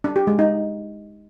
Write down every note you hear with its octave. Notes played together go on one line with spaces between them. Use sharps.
D4
G4
G#3
D#4